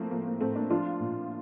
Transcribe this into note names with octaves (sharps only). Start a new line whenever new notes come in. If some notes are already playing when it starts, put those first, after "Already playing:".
Already playing: A2 F3 A3 A#3 C4
F3 A#3
A#3
A2 A3 C4
A#3 D4
F3 D4 F4
A#2